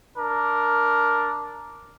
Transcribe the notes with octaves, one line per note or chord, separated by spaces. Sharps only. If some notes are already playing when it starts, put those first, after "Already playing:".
D4 A#4